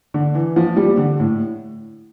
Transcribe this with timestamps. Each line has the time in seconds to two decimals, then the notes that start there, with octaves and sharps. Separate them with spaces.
0.14 D3
0.35 E3
0.56 F3
0.77 G3
0.97 D3
1.20 A2